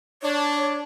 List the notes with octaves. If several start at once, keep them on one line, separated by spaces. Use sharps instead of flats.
D4 C#5